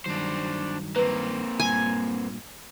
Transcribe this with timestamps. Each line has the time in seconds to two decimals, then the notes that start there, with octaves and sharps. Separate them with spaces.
0.06 G2 D#3 F#3 D4 C5
0.96 A#3 C4 B4
1.60 G2 A#2 G#5